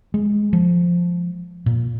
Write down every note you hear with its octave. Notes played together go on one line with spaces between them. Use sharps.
G#3
F3
A#2